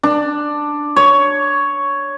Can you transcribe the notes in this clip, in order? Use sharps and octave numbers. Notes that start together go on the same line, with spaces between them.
D4
C#5